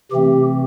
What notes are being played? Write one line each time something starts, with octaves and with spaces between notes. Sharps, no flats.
C3 E3 A3 C4 G4